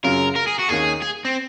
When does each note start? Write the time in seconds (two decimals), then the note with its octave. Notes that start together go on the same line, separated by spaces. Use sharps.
0.04 F#2 C#3 F#3 C#4 F4 A#4
0.36 A#4
0.48 G#4
0.59 F#4
0.69 D#2 D#3 A#3 C#4 G#4
1.02 G#4
1.25 C4